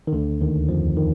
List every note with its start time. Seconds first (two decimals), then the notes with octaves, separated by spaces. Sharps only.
0.07 D#3
0.13 D2 D3
0.41 D#2 D#3
0.69 F2 F3
0.97 D#3